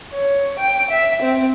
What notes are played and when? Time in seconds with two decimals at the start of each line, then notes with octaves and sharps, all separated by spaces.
0.13 C#5
0.59 G5
0.90 E5
1.21 C4